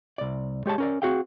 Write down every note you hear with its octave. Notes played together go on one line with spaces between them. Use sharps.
C2 D5
G#3 G4 C#5 A5
C#4 A#4 D5
C4 F#4 G#4 F5 G5